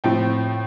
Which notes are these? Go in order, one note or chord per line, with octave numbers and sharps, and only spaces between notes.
A2 F3 C4 G5